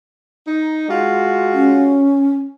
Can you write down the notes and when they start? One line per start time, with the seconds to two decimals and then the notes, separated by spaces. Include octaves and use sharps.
0.47 D#4
0.89 G#3 F4 F#4
1.53 C#4